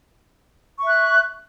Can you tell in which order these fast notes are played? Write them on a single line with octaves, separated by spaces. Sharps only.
C#6 E5 F#6